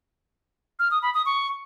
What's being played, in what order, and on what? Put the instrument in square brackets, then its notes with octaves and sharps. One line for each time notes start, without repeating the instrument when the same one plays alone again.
[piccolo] F6
D#6
B5
D#6
C#6